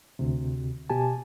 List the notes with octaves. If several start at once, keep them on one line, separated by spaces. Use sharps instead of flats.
D2 C3
B2 G4 G#5 A5